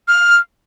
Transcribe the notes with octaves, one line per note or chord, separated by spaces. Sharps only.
F6